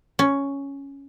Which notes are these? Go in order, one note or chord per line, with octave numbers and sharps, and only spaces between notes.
C#4